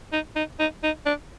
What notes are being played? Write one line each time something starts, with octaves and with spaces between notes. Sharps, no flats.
D#4
D#4
D#4
D#4
D4